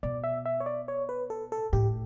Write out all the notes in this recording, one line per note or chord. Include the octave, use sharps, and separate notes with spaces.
B2 D5
E5
E5
C#5
D5
C#5
B4
A4
A4
A2 G4